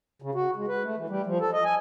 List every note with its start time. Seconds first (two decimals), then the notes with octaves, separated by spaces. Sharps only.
0.22 C#3
0.35 F#4
0.56 G#3
0.68 B4
0.83 A3
0.97 E3
1.10 G3
1.26 F3
1.40 A4
1.53 D#5
1.65 G#5